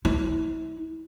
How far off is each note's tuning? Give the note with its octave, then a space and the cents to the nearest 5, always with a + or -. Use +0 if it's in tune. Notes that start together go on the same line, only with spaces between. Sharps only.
E4 -35